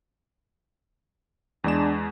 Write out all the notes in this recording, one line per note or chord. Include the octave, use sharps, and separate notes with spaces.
E2 G#3 D4 E7